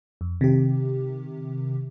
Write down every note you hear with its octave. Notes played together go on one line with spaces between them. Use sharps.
F2
C3 D#3 G4